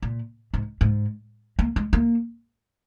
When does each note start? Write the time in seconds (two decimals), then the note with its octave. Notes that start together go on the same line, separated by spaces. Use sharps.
0.02 A#2
0.54 G#2
0.81 G#2
1.59 A#3
1.76 G#3
1.93 A#3